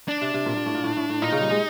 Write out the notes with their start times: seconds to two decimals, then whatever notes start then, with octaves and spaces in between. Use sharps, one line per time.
0.08 D4
0.21 C3
0.34 C3
0.46 A#2
0.56 A#2
0.66 A2
0.75 A#2
0.84 A2
0.97 A2
1.09 A2
1.22 A#2 D#4
1.32 C#3
1.41 G3
1.51 G#3